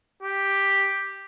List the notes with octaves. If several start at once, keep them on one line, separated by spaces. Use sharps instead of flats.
G4